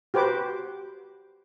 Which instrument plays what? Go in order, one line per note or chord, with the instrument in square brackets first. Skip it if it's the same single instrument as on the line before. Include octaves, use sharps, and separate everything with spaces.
[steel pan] F#4 G4 B4 C5 D6